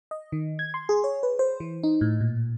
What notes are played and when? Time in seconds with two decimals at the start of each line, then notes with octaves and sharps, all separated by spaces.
0.11 D#5
0.32 D#3
0.59 G#6
0.74 C6
0.89 G#4
1.04 C#5
1.23 B4
1.39 C5
1.60 E3
1.83 D#4
2.01 A2
2.21 A#2